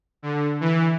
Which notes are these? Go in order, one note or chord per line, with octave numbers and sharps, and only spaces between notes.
D3
E3